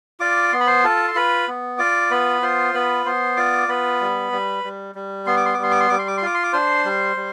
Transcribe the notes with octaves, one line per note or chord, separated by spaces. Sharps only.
F4 D5 D6
B3 C6
B5
C5 C6
F4 A4 A5
C6
F4 B4 B5
B3
F4 D5 D6
B3 B4 B5
F4 C5 C6
B3 B4 B5
B3 C5 C6
F4 D5 D6
B3 B4 B5
G3
G3
G3
G3
B3 C6
D6
C6
D6
G3 C6
D6
C6
G3 D6
C6
D6
C6
F4 D6
C6
D6
D4 C5 C6
G3
G3